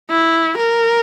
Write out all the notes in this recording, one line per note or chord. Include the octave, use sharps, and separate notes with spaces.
E4
A#4